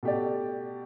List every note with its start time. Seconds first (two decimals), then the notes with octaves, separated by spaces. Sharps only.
0.03 B2 A3 G4 D5